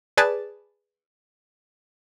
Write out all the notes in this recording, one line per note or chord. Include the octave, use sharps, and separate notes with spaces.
G#4 B4 D5 G#5 A5